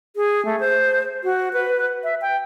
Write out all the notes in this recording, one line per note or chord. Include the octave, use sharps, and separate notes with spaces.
G#4
A3
C5
F#4
B4
E5
G5